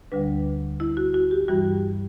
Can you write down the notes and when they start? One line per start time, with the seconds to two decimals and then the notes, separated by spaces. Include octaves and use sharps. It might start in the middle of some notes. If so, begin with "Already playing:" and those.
0.12 D2 D3 G3 D4 B4
0.80 E4
0.97 F#4
1.14 F#4
1.31 G4
1.48 G2 E3 G3 F#4